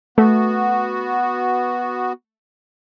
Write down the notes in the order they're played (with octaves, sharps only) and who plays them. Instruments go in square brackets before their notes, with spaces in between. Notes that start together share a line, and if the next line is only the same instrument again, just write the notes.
[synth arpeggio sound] A3 [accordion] B3 F#4